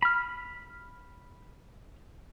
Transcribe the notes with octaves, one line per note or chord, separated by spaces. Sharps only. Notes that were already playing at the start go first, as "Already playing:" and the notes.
B5 F6